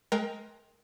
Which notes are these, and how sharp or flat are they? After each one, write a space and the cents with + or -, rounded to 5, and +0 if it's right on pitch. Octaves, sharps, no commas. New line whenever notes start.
G#3 +30 A#4 +0 G5 +10